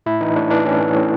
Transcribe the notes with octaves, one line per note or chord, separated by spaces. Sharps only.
A2 E4
E3 D#4
A2 D4
E3 D4
A2 C#4
E3
A2